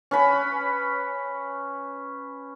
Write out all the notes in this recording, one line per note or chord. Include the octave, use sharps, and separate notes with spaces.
C#4 B4 B5